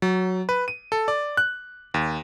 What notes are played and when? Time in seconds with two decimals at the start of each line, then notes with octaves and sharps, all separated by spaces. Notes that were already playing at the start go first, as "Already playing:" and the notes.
0.02 F#3
0.49 B4
0.68 D#7
0.92 A4
1.08 D5
1.37 F#6
1.94 D#2